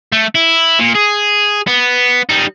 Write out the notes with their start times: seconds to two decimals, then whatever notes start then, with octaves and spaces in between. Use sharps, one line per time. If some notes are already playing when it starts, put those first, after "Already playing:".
0.12 A3
0.35 E4
0.79 A#2
0.95 G#4
1.67 B3
2.29 G3 D#4